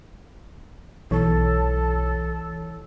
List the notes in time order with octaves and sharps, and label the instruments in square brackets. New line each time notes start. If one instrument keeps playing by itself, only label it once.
[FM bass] B1 [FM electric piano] E3 C#5 [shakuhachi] A4